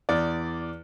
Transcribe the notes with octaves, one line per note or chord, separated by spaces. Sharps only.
E2 D5